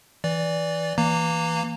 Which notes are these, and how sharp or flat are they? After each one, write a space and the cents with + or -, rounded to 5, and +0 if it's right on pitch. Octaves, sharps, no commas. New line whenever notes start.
E3 -5 D5 -10
E3 +0 A#3 +0 A#5 -25